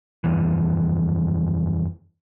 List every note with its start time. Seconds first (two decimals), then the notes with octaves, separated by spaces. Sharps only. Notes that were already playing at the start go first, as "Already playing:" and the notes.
0.24 F#1 E2 G2 E3